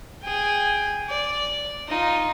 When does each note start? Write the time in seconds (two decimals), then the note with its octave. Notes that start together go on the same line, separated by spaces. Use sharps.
0.22 G#4 G5
1.09 D5
1.88 D#4 F4